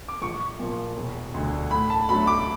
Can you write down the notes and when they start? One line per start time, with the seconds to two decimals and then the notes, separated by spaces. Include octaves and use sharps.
0.08 D6
0.22 A#1 C#6
0.60 A#2 F3
0.97 E1
1.34 D2 D3
1.71 A2 B5
1.90 A5
2.09 F#3 A3 D4 B5
2.27 D6